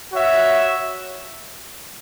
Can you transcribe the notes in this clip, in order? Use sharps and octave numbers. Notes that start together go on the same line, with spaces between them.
F#4 C#5 E5